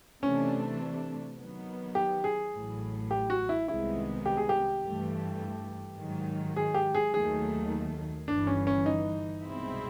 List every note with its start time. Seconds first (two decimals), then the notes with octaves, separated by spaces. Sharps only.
0.23 C3 E3 A3 C#4 D4
1.37 D#3 F#3 B3
1.95 G4
2.24 G#4
2.53 A1 A2 F#3
3.11 G4
3.30 F#4
3.49 E4
3.68 C2 C3 D#3 G#3 B3 E4
4.26 G4
4.37 G#4
4.49 G4
4.84 G2 E3 A3
5.99 G#2 D#3 F#3
6.56 G#4
6.74 G4
6.95 G#4
7.13 D#2 D#3 F#3 A3 G#4
8.28 G1 G2 E3 D4
8.47 C#4
8.67 C#4
8.86 D#4
9.44 C2 B2 G#3 C4 E4